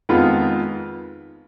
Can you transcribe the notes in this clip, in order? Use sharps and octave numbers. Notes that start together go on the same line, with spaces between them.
F2 D#3 G#3 B3 F4